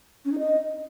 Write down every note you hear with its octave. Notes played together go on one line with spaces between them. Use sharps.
C#4
D#4
D#5